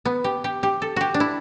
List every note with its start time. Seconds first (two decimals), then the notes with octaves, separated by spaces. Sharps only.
0.05 B3
0.24 G4
0.44 G4
0.63 G4
0.82 A4
0.96 F#4 G4
1.14 D4
1.20 E4